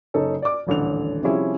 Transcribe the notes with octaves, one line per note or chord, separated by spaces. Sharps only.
F#1 C#3 D#4 A4 C#5
D5 D6
D#1 A1 D3 F7
C3 F3 G3 C#4 E4 G#4